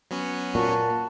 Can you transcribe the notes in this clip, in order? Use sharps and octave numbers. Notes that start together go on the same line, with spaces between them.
F#3 B3 C#4
A#2 F#4 A5